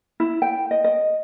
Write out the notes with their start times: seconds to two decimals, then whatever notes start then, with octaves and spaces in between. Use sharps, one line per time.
0.20 E4
0.42 G5
0.71 D#5
0.84 D#5